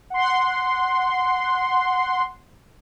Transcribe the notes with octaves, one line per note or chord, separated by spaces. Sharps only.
F#5 C6